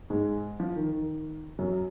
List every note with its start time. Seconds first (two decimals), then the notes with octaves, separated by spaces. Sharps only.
0.10 G#2 G#3
0.60 F3
0.76 D#3
0.92 D#3
1.59 F#2 F#3